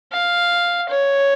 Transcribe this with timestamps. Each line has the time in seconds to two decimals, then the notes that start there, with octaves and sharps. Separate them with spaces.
0.12 F5
0.88 C#5